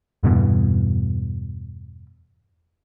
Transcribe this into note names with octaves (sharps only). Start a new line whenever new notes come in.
E2 G2 B2 E3